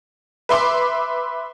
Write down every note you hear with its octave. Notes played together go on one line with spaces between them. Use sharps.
B4 E5 C6 D6